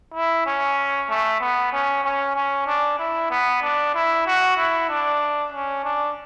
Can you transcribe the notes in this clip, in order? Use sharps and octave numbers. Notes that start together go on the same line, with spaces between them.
E4
C#4
A3
B3
C#4
C#4
C#4
D4
E4
B3
D4
E4
F#4
E4
D4
C#4
D4